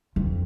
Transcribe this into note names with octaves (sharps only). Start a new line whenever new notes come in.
F2